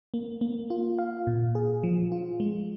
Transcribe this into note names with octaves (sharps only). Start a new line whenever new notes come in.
A#3
A#3
F4
F5
A#2
G#4
F3
F4
G#3